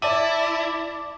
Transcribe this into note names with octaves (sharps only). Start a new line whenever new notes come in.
E4 D5 A5 D6 D#7